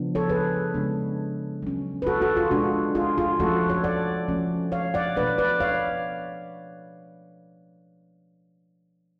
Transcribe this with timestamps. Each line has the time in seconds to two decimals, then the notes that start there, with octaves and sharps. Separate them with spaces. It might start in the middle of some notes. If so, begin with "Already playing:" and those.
Already playing: C#3 F3 B3 D4
0.15 A4 C#5
0.29 G#4 B4
0.74 C#3 G#3 B3 D4
1.62 F#3 C#4
2.02 B4
2.06 F#4 A4
2.21 F#4 A4
2.37 F4 G#4
2.51 B2 G#3 D4 F#4
2.95 F4 G#4
3.18 F4 G#4
3.40 F3 A3 C#4 F#4 A4
3.69 A4 C#5
3.84 D5 F#5
4.28 F3 A3 C#4
4.72 C#5 F5
4.94 D5 F#5
5.17 B2 A3 D4 B4 D5
5.38 B4 D5
5.60 C#5 F5